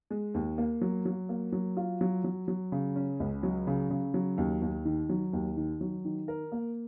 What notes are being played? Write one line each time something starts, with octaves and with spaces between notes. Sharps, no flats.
G#3
D#2
A#3
F#3
F#3
A#3
F#3
F4
F#3
F#3
F#3
C#3
C#4
C#2
F#3
C#3
C#3
F#3
D#2
D#2
D#3
F#3
D#2
D#3
F#3
D#3
A#4
A#3